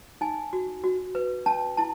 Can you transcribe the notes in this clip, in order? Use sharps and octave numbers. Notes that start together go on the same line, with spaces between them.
D#4 G#5
F#4
F#4
B4
C#4 A5
E4 A5